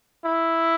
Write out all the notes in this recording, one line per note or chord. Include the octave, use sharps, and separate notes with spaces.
E4